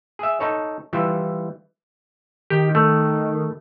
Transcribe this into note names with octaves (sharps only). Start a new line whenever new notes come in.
G#4 E5
D#4 A4 C#5
E3 G3 F4 E5
D#3 G4
A3